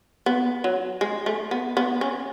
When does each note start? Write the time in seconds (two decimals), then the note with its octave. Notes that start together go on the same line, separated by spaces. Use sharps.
0.26 B3
0.64 F#3
1.01 G#3
1.26 A3
1.51 B3
1.77 B3
2.01 C#4